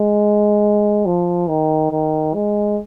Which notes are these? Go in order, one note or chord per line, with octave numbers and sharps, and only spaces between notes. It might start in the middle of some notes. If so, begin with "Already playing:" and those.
Already playing: G#3
F3
D#3
D#3
G#3